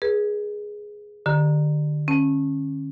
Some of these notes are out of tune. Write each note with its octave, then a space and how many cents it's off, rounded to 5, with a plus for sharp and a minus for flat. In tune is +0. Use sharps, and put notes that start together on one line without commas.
G#4 +0 B4 -30
D3 +35 G4 +0 A#5 +0
C#4 -20 A5 -5